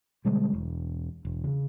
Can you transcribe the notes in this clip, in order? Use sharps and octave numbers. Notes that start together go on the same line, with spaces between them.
B2 D3 G3 G#3
E1
E1
C#3